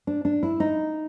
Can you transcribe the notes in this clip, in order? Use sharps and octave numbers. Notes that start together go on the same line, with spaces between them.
D4
D4
E4
D#4